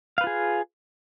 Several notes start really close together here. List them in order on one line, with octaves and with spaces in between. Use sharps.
F5 B4 F4 G#4